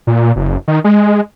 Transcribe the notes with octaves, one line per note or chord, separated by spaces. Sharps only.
A#2
F#1
D#3
G#3